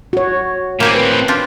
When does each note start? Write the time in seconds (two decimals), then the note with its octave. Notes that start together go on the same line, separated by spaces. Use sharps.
0.13 F#4 C#5
0.80 A2 A#3 C4 G4 G#5
0.94 B4
1.28 D4 F4 G4